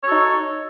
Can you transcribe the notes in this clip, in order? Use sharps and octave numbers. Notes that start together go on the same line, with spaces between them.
D#4 F#4 A4 C#5